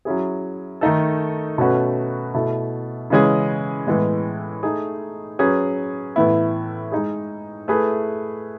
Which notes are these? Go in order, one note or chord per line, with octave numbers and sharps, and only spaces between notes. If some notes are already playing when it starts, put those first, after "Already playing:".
F#3 C#4 E4 G#4
D#3 A3 D#4 A4
B2 A3 C#4 F#4 B4
B2 A3 E4 A4
C#3 E3 G#3 C#4 G#4
A2 E3 G#3 B3
A3 D#4 G#4
F#3 C#4 G#4 B4
A2 E3 B3 E4
G#3 D#4 G#4
A3 E4 G#4 B4